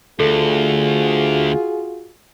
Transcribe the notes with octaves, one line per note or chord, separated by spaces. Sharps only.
D2 F4 F#4 G#4 A4